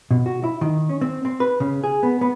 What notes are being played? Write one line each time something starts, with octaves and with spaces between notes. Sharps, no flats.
B2
F#4
E4
D#3
C#4
C4
C4
B4
C#3
G#4
B3
B3